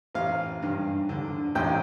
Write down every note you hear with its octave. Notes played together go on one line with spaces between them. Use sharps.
A1 F5
G2
D3
A1 G5